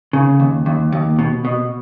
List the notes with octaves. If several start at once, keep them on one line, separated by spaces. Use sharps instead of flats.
C#3
D#2
D#2
D#2
B2
B2